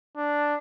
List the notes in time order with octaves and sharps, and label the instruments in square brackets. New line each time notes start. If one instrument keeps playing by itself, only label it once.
[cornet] D4